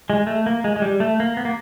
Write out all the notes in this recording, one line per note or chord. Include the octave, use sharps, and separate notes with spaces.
G#3
A3
A#3
G#3
G#3
G3
A3
A#3
B3
A#3